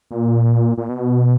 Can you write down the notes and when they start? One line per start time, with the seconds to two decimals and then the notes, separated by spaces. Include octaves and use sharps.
0.11 A#2
0.77 A#2
0.89 B2